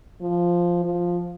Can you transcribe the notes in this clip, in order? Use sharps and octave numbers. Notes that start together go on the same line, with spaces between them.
F3
F3